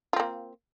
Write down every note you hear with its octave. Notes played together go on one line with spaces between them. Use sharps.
A#3 C4 F4